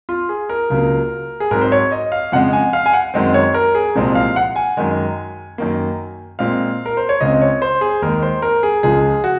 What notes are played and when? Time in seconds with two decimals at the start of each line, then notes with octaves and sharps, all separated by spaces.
0.09 F4
0.29 G#4
0.49 A#4
0.70 C#2 C#3 F#3 A#3
1.40 G#4
1.51 G#2 F#3 C4 A#4
1.61 C5
1.72 C#5
1.92 D#5
2.12 F5
2.32 F2 C#3 G#3 F#5
2.53 G#5
2.73 F5
2.86 G#5
2.93 F#5
3.14 F#2 D#3 G#3 C4
3.34 C#5
3.54 A#4
3.75 G#4
3.95 C2 A#2 F3 G#3 C4
4.15 F5
4.36 F#5
4.56 G#5
4.77 F#2 D#3 G#3
5.58 F#2 D#3 A#3
6.39 A#2 G#3 C4 F5
6.86 A#4
6.97 C5
7.09 C#5
7.20 C#2 C#3 G#3 C4 D#5
7.41 C#5
7.62 C5
7.81 G#4
8.02 D#2 D#3 G#3 A#4
8.23 C5
8.42 A#4
8.63 G#4
8.83 C#2 C#3 F3 G#3 G#4
9.24 F#4